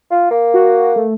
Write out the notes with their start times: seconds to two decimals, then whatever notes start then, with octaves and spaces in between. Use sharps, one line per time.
0.11 F4
0.31 A#3
0.54 F#4
0.96 A3